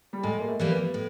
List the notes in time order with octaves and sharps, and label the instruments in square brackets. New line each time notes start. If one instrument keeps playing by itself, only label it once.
[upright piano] G3
[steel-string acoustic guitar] A2 [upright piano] G#3
[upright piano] A#3
A3
[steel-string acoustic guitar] E3 G3 A#3
[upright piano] B3
[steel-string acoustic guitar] A2